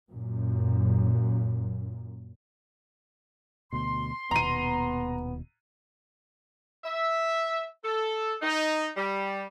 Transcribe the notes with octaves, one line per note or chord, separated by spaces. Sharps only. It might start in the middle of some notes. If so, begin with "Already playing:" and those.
F#2 A#2
D2 B2 C6
D#1 D#2 B2 B3 A#5 D#7
E5
A4
D#4
G3